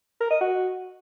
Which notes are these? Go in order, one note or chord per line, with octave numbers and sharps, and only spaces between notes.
A#4
D#5
F#4